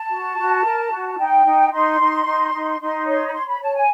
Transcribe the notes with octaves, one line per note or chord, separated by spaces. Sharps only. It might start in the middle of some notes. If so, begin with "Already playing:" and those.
Already playing: A5
F#4
F#4
A#4
F#4
D#4 G5
D#4
D#4 C6
D#4
D#4
D#4
D#4 C6
C#5 C6
B5
C#5 C6
B5
C#5 A5
G#5